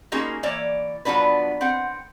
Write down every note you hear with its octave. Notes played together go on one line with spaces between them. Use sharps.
G#3 A#3 C#4 D#4 F#4 G#4
E3 A#3 C#5 D5
F3 F#3 B3 D4 B4
C4 F#5